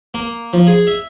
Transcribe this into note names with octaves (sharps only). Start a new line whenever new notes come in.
A#3
F3
G#4
E5